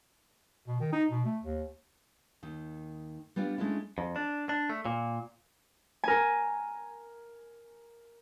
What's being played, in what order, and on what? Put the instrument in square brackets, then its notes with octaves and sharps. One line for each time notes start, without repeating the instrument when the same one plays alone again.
[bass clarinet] B2
D#3
D#4
B2
A3
D#2
[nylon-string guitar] D#2 D#3
G3 B3 D4 F4 D5
G#3 A3 C#4 D4 E4 F4
[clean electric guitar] F2
D4
D4
A3
A#2
[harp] A#4 G#5